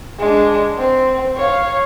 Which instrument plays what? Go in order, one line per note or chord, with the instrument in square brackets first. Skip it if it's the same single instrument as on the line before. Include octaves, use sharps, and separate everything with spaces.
[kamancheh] G#3 D4
C4
C#5 F5